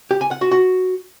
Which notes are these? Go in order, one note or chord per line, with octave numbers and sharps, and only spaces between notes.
G4
G#5
F#5
F#4
F#4